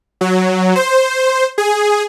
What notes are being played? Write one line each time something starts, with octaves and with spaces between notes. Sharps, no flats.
F#3
C5
G#4